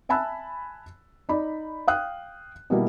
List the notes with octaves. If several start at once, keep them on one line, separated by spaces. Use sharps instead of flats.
E5 G#5 A5 B5 E6 F#6
D#4 D5 B5
F5 G5 D#6 F#6
B2 D#3 G3 A#3 D#4 E4